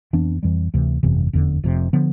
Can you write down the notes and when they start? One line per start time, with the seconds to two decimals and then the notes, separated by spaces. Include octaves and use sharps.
0.13 F2 E3 B3 D4
0.43 F2 E3 G3
0.74 D2 C3 E3
1.03 G1 F2 C3 E3
1.33 F1 E2 D3
1.63 F1 F2 C3
1.93 D3 F3 B3